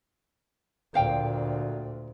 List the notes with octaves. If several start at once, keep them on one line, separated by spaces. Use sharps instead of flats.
D2 A#2 C5 F5 G5